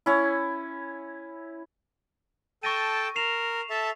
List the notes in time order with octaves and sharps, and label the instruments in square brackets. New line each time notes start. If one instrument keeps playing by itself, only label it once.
[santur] C#4 E4
[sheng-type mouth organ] A4 G5 A5 [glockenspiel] C#6 A#6 D#7
[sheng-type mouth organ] A#4 [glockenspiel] C7 E7 F7
[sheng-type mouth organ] A4 E5 A5